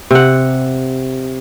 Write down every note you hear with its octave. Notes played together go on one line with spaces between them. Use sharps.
C3 F#5